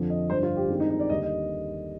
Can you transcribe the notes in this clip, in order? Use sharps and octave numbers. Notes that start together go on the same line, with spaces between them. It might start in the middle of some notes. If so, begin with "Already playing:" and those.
Already playing: F2 D3 F3
D#5
G2 D3 F3 C5
F4
G4
G2 D#3 G#3 C4
D#4
D#4
D5
D#2 D3 G3 D#5
D#5